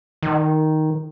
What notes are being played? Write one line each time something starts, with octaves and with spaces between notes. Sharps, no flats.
D#3